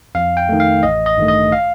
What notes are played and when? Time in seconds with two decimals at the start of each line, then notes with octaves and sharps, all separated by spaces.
0.15 F2 F5
0.37 G5
0.49 D#3 A3
0.60 F5
0.83 A1 D#5
1.06 D#5
1.17 G2 D#3 A3
1.28 D#5
1.52 F5